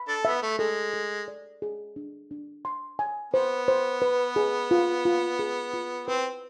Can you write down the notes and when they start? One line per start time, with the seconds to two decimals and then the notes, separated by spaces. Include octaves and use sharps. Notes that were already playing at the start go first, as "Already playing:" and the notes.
Already playing: B5
0.08 D4 A4
0.25 B3 E5
0.43 A3
0.59 G#3 A4
0.93 A4
1.28 D5
1.62 G#4
1.96 D4
2.31 D4
2.65 C6
2.99 G#5
3.34 B3 C5
3.68 C5
4.02 B4
4.36 G#4
4.71 F4
5.05 F4
5.39 G#4
5.73 F4
6.08 C4 B4